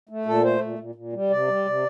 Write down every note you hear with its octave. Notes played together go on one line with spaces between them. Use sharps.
A3
A#2 A4
A3 C5
A#2
A#2
A#2
G3
C3 D5
G3
C3